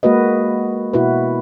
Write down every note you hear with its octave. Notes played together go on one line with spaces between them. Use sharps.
G#3 A#3 F#4 B4 D#5
B2 E4 F#4 B4